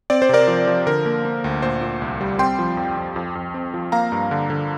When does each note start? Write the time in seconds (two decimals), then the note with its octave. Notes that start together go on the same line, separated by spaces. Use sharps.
0.10 C4 D5
0.22 C5
0.29 C3 A#4 D5
0.47 F3
0.67 F3
0.87 D3 A#4
1.06 A#3
1.25 A#3
1.44 D2
1.62 A#2 C5
1.81 A#2
2.02 C2
2.21 G3
2.39 C4 G5 C6
2.59 F3
2.77 F2
2.97 F2
3.16 F2
3.35 F2
3.54 C4
3.74 F3
3.92 A#3 F5 A#5
4.12 G2
4.31 D3
4.50 D3